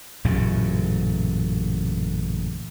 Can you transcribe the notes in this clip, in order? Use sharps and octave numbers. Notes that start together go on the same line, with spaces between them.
A1 F#2 A#2 C#3